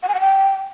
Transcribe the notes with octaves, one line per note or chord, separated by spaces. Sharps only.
F#5
G#5
F#5
G5